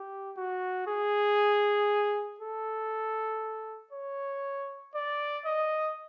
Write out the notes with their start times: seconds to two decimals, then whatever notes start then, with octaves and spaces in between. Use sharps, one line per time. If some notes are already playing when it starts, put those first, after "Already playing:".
Already playing: G4
0.37 F#4
0.87 G#4
2.40 A4
3.93 C#5
4.95 D5
5.46 D#5